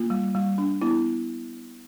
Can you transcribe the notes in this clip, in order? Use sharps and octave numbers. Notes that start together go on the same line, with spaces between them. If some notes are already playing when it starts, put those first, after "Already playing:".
Already playing: A#3 F4
G3
G3
D4
B3 E4